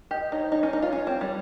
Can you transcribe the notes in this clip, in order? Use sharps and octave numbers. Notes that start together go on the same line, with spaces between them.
G4 D#5
D#5
D#4 C#5
C5
D#4 C#5
C#4
D#4
F4
C#4
C4
G3